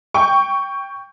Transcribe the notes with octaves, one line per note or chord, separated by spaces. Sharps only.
G5 C#6